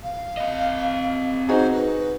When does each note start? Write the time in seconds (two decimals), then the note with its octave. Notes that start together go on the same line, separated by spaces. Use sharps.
0.03 F5
0.37 C4 D#5
1.49 D#4 F#4 G#4 C5
1.71 B4